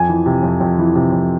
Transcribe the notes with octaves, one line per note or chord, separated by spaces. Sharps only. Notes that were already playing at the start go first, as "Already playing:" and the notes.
Already playing: F2 G#5
E3
C3
F2
F2
E3
C3
F2